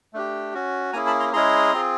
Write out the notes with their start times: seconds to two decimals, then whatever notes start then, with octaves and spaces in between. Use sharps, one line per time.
0.13 A3 D4 G4
0.54 C#4 F#4
0.93 A#3 C#4 E4 G#4 G#5 A#5
1.07 A5 B5
1.20 A#5 C6
1.33 G#3 C#4 E4 G#4 A#5 C6
1.73 C4 F4 G#4